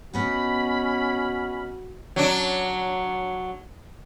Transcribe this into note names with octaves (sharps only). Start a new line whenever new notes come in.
B3 C#4 F#4 D#5 F#5 B5
F#3 D4